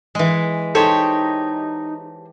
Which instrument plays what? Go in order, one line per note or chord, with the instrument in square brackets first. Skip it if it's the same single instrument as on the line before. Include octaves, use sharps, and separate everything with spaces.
[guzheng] E3 G#3
[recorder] D#4 [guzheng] G4 [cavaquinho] A4 C5 C#5